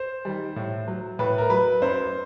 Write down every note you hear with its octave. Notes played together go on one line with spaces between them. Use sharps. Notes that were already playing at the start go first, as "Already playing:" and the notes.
Already playing: C5
D#3 G3
A2
F#3
A2 B4
A#4
F#3 B4
F#2 C5